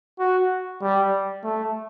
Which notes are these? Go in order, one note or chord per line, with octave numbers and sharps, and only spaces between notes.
F#4
G3
A3